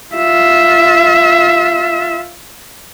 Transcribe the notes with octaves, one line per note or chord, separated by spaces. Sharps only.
F4 E5